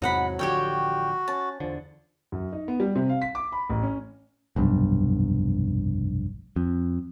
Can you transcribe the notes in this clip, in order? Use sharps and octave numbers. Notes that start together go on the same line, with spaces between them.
E2 G#2 C3 F#3 D#4 F#5 B5
A1 D3 F3 F#4 G4 C#5 G5
C#4 A5
E2 D3 F3
F#2
D#4
B3
G3
C3
F5
B6
D6
B5
A1
C#4
F1 B1 G2
F2